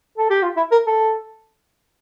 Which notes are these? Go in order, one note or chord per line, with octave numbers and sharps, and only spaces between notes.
A4
G4
F4
E4
A#4
A4